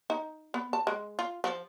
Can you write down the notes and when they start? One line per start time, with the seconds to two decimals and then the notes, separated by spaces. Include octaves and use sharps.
0.10 D#4
0.54 B3
0.73 A5
0.87 G#3
1.19 F4
1.44 F3